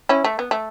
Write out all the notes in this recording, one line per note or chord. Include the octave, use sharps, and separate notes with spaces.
C#4 E4
A3
B3
A3